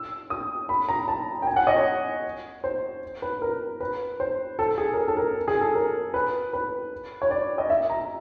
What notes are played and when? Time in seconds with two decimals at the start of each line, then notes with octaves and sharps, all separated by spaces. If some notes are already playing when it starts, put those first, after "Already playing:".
Already playing: E6
0.30 D#6
0.69 B5
0.89 A#5
1.08 A5
1.42 G5
1.47 G#5
1.56 F#5
1.67 D#5
1.76 C#5
2.64 C5
3.22 B4
3.42 A#4
3.80 B4
4.20 C5
4.59 A4
4.78 G#4
4.93 A#4
4.97 A4
5.08 A4
5.17 A#4
5.48 G#4
5.61 A4
5.75 A#4
6.14 B4
6.53 B4
7.22 C#5
7.31 D5
7.58 D#5
7.70 E5
7.90 A#5